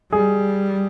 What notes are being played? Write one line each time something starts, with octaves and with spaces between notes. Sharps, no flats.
G3 G#4